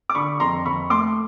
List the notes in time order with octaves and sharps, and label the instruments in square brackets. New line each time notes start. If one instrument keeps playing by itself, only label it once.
[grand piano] D6
D3 B5 C#6
F2 A#5 C6
F2 B5 C#6
A3 C6 D6